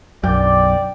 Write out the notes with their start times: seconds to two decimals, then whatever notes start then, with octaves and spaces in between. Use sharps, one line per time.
0.23 B1 F#2 D5 G5